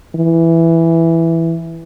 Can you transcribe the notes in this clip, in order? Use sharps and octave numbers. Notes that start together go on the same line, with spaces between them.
E3